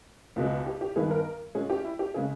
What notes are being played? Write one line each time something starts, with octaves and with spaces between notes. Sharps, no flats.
C#2 B2 G#3
G4
G4
G2 D#3 G#3 B3 G#4
A#4
A#2 G#3 C#4 G#4
G4
E4
G4
C#3 G#3 G#4